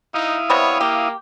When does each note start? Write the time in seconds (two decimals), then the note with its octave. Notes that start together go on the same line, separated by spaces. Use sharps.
0.14 D#4 E4 F5 D#6
0.50 C3 G3 B3 C#5
0.81 A#3 G4